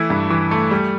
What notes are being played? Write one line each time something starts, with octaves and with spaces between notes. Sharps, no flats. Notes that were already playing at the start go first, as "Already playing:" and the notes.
Already playing: E3 A3 E4
G2
E3
A3
G3